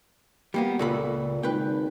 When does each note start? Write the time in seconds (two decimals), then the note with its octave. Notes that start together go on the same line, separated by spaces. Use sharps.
0.54 G3 A#3 B3
0.79 C#2 A#2 A4 B5
1.43 G#1 B4 G5